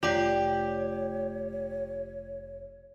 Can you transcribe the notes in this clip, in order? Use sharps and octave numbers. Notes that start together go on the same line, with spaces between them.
F1 A3 F4 G4 C#5 D5 G5